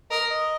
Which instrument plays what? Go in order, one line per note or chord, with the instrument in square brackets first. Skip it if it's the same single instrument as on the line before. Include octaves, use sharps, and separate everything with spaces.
[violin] A#4 [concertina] D#5
[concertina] D#5